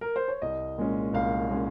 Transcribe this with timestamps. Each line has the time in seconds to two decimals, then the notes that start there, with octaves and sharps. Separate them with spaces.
0.01 A#4
0.16 C5
0.28 C#5
0.42 C2 D#5
0.78 A#2 G#3 C#4
1.13 C2 F5
1.50 A#2 G#3 C#4